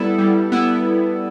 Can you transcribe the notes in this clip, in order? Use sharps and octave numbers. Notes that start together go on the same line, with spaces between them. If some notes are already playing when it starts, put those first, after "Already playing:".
Already playing: G3 B3 E4 A4
G3
B3 E4